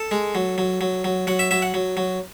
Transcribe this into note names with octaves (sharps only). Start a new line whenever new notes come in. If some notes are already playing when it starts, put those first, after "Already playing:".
Already playing: A4
G#3
F#3
F#3
F#3
F#3
F#3 F#5
E5
F#3 E5
F#5
F#3
F#3